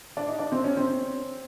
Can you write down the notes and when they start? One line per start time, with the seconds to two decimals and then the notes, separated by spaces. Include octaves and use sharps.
0.17 D4
0.28 D#4
0.39 D4
0.52 C4
0.64 C#4
0.77 C4